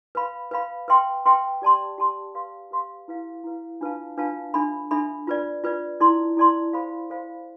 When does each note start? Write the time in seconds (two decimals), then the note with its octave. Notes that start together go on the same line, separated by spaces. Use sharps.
0.15 B4 F5 B5
0.51 B4 F5 B5
0.88 B4 E5 G5 C6
1.26 B4 E5 G5 C6
1.62 G4 D5 A5 C6
1.98 G4 D5 A5 C6
2.35 G4 B4 F5 C6
2.71 G4 B4 F5 C6
3.08 E4 B4 F5
3.44 E4 B4 F5
3.81 D4 F4 B4 F5 A5
4.17 D4 F4 B4 F5 A5
4.54 D4 A4 E5 B5
4.91 D4 A4 E5 B5
5.27 F4 B4 D5
5.64 F4 B4 D5
6.00 E4 A4 D5 A5 C6
6.37 E4 A4 D5 A5 C6
6.73 A4 C5 F5 B5
7.10 A4 C5 F5 B5